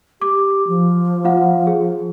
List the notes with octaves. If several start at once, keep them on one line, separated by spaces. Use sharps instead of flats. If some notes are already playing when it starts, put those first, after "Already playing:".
G4 D6
F3
F4 F5 F#5
G#4